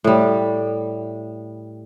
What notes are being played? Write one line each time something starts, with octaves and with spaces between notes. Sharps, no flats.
A2 G3